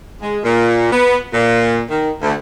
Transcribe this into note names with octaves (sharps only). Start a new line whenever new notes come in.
G#3
A#2
B3
A#2
D#3
D2